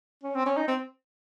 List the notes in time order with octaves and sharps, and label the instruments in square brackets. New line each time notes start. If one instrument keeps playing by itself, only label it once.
[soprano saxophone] C#4
C4
C#4
D#4
C4